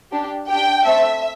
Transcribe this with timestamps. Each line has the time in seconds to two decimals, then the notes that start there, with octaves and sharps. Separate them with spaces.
0.12 D4 G4
0.48 D4 G4 G5
0.85 A3 C4 A4 E5